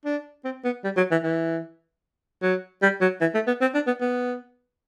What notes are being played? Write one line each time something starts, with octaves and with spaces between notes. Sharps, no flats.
D4
C4
B3
G3
F#3
E3
E3
F#3
G3
F#3
E3
A3
B3
C4
D4
B3
B3